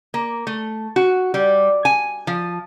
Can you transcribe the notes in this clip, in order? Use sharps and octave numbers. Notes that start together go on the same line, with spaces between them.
A#3
A3
F#4
G3
G#5
F3